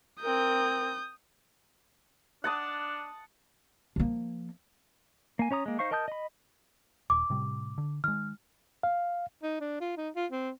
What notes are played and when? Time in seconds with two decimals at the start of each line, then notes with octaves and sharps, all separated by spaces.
0.21 C4 A#4 D#6 G6
2.44 D4 F#5 A5 D#6
3.96 F3 A#3
5.39 A#3 G#5
5.51 C#4 C#5 A#5 D#6
5.66 G#3 A#3
5.79 D#4 C5 F5 C#6
5.91 A#4 D#5 A5 D#6 G6
6.08 D#5 B5
7.10 D#1 D6
7.30 A2 C3 G3
7.78 D3
8.04 D#3 G#3 F6
8.83 F5
9.43 D#4
9.60 D4
9.80 F4
9.97 D#4
10.16 F4
10.32 C4